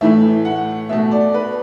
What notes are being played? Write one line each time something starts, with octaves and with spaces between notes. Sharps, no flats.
A2 E3 A3 E5
F#5
B2 A3 E5
D5
B4